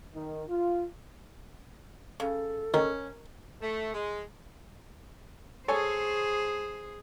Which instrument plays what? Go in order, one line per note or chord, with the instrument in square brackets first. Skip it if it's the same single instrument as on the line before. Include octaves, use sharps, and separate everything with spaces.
[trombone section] D#3
F4
[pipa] C#3 [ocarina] A4
[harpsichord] D#3 [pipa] C#4 [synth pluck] A#4
[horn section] A3
G#3
[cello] G#4 C5 [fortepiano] A4 C#5 G#5